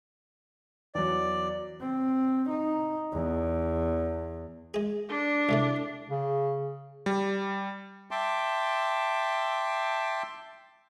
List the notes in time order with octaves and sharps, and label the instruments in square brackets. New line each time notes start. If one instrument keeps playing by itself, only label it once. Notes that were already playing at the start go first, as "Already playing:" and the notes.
[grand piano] E2 F#3 [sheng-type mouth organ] D5
[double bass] C4
D#4
E2
[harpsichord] G#3 G#4
[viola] D4
[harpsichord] C2 A2 A3
[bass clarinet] C#3
[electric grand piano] G3
[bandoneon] E5 G5 A5 C6 D6